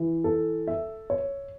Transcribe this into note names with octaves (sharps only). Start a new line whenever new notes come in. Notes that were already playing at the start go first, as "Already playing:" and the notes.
Already playing: E3
A4
E5
C#5